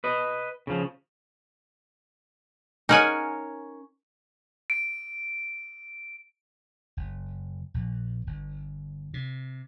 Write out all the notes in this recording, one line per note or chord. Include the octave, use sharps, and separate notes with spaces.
B4 D#5
C#3 F3
C#4 D#4 A#4 C#5 F#5 G#5
D7
F#1
A#1
G1
C3